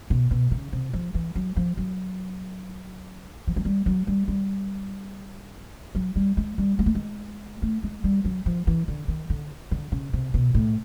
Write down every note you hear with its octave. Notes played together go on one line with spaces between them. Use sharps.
B2
B2
C#3
C3
F3
E3
F#3
F3
F#3
F3
F#3
G3
F#3
G3
G3
F#3
G3
G#3
G3
G#3
A3
G#3
A3
G#3
G3
F#3
F3
E3
D3
D#3
D3
D3
C#3
C3
B2
A2